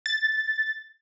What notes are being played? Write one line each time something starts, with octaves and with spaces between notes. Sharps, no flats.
A6